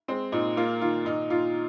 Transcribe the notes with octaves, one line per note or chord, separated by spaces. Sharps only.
G#3 C4
A#2 D#4
A#3 F4
D#3 F4
A#2 D#4
A#2 F4